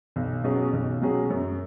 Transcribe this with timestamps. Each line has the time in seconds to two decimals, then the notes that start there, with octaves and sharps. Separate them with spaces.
0.16 B1
0.44 B2 F#3 C#4 G#4
0.73 B1
1.01 B2 F#3 C#4 G#4
1.30 F#2